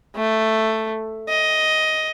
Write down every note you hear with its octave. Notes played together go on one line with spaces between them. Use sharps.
A3
D#5